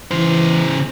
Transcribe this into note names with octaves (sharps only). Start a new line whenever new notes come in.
C#3 E3 C5